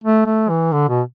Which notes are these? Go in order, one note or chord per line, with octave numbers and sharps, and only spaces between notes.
A3
A3
E3
D3
B2